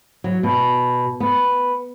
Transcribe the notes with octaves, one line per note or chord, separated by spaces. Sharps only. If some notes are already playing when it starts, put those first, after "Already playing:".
F#3
B2
B3